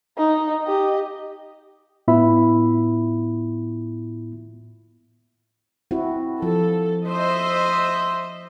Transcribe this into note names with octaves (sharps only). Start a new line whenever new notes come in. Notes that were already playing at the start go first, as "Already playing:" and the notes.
D#4
G4 D#5
A2 B3 E4 F4 E5 B5
C4 E4 F#4
F3 A4
C5 D#5 E5